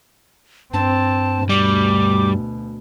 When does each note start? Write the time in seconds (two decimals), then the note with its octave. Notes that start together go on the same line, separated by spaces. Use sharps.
0.74 G2 C4 A5
1.49 D2 B2 G3 D6